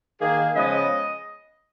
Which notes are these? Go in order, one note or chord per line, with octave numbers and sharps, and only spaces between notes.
D#3 A#3 G#4
C#3 F3 G#3 B3 D#5